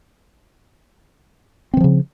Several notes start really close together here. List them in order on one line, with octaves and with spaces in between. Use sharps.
C4 E3 F3 C#3